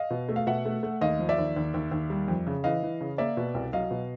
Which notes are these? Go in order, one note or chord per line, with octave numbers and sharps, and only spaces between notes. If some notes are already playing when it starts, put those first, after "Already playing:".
Already playing: D#5 F5
B2
A3
F5
B2 E5 F#5
A3
A3
D#2 D#5 F5
F3
D5 E5
D#2
D#2
D#2
D#2
G3
F2
C#3
E3 D#5 F5
E3
C#3
A#3 D5 E5
B2
C2
F#3 D#5 F5
B2